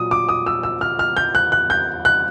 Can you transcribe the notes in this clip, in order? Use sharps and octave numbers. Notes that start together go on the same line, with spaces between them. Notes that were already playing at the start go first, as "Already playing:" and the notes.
Already playing: A#2 F#3 D#6
D6
D#6
E6
E6
F6
F6
G6
F#6
F#6
G6
F#6